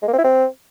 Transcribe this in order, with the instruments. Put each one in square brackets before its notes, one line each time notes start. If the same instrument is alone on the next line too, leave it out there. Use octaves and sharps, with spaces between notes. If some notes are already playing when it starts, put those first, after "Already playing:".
[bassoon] G#3
A#3
C4
E4
C4